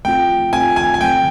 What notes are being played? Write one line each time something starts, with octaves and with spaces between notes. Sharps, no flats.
A3 C4 F4 G5
A3 C4 F4 G#5
G#5
G#5
C#3 F#3 A3 C4 G5